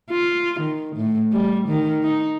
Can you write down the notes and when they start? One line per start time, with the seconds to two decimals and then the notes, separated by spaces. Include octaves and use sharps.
0.10 F4
0.60 D#3
0.96 A2
1.32 G3
1.68 D#3
2.03 D#4